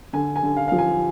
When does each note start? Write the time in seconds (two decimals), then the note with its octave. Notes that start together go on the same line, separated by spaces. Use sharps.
0.13 D3 G#5
0.36 G#5
0.43 D3
0.57 F5
0.68 F3 F5
0.79 G#5